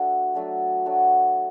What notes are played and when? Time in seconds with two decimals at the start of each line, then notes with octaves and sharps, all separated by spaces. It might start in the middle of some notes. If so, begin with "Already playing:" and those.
Already playing: A3 D4 F#4
0.34 F#3 A3 D4 F#4
0.86 F#3 A3 D4 F#4